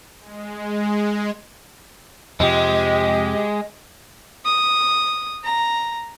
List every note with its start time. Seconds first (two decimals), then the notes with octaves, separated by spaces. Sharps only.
0.20 G#3
2.40 F2 C3 F3 G#3 G4 D#5
4.45 D#6
5.44 A#5